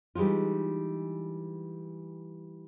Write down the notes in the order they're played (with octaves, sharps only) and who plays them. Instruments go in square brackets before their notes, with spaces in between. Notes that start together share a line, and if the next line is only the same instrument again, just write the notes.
[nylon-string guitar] E3 G3 G#3 D#4 F4